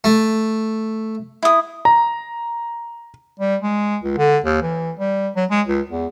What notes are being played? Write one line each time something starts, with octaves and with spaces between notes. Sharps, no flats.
A3
E4 D#6
A#5
G3
G#3
C#2
D3
D#2
E3
G3
F#3
G#3
C#2
E2